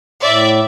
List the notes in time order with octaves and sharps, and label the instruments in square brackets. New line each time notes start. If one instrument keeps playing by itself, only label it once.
[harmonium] A2 [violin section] D5 E5